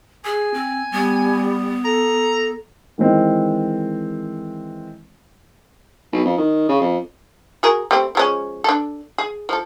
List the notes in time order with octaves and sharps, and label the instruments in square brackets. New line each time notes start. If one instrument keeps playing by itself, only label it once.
[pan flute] G#4 [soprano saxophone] G#5
[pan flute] C4
[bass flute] G3 [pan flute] B3
[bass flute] A4 [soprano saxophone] A#5
[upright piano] D#3 E3 G#3 C4
[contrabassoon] B1
F2
D#3
C#3
F2
[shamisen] F#4 G#4 A#4
G3 A3 C4
F3 G#3 C#4
D4 A4
G#4
F3 A4